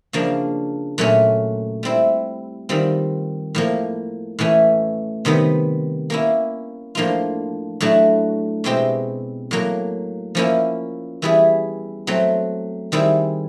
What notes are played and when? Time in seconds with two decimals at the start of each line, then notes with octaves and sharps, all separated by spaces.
0.13 C#3 F3 A#3 D4
0.98 A#2 F#3 A3 C#4
1.83 G3 C4 E4
2.69 D#3 G3 C4 F4
3.55 A2 F3 A#3
4.39 A2 E3 A3 C#4
5.25 C3 D#3 G3 B3
6.10 A#3 C#4 E4
6.95 A2 F3 A#3 D4 F4
7.80 A2 F#3 A3 D4 F#4
8.64 B2 G#3 C4 E4 G4
9.51 A2 F#3 A#3
10.35 F3 A#3 C#4 E4
11.22 E3 G3 B3 E4 G#4
12.07 F#3 A3 C4
12.92 D#3 G3 C4 E4 G#4